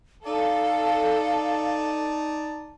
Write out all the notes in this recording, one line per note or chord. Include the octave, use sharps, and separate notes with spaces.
D#4 A4 D5 F5 A5